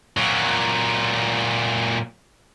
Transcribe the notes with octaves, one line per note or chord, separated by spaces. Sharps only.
A#2 F#3